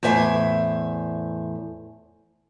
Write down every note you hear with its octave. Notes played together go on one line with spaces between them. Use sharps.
E2 A2 C5 E5 G#5